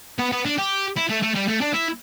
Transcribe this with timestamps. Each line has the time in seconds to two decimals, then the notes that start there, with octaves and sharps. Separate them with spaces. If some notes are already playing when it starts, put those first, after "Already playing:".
0.19 B3
0.32 B3
0.45 D4
0.58 G4
0.96 E4
1.09 A3
1.22 A3
1.35 G3
1.48 A3
1.61 D4
1.73 E4